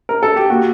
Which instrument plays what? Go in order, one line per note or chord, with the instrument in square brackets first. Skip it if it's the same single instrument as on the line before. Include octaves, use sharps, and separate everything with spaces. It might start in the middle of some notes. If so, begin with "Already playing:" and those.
[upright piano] A#4
A4
G4
[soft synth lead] A#3 [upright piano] F#4